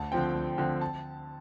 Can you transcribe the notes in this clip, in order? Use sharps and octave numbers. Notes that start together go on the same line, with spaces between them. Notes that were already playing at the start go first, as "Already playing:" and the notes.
Already playing: D2 A5
D3 F3 C4 G5
D2
D3 F3 C4
A5